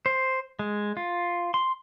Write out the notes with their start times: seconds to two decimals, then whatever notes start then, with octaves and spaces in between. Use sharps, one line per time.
0.06 C5
0.59 G#3
0.97 F4
1.54 C6